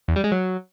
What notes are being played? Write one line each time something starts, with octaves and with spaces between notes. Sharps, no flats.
E2
G3
G#3
F#3